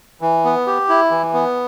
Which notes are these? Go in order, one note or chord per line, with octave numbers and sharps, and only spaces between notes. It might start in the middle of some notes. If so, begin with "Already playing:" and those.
E3
B3
G4
E4
E3
B3